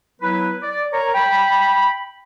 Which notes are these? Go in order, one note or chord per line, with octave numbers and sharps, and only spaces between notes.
F#3 B3 E4 B4
D5
A#4 C#5 A#5
G5 B5